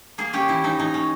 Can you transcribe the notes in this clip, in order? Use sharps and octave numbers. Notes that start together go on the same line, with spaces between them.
A#3 G#4
C#4 G4
E3 E4
E3 D#4
E3 D#4
C#4